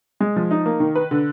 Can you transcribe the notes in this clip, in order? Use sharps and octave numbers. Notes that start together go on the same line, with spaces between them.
G#3
F3
D#4
A#3
D#3
B4
D3